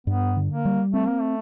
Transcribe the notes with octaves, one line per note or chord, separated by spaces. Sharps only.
G2 B3
D3
A#3
G3
A3 C4
A#3
A3